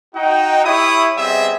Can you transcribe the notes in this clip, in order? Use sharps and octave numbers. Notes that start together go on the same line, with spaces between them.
D#4 F#4 G5
E4 G4 C#5 E5 B5 D#6
G3 B3 C4 G#4 D#5 E5